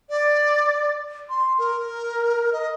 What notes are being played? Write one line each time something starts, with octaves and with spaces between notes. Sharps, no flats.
D5
C6
A#4
D#5